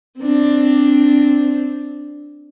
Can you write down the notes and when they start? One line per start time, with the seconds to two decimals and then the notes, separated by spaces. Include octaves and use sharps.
0.19 C4 D4